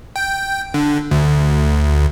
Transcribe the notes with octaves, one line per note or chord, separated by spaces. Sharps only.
G5
D3
D2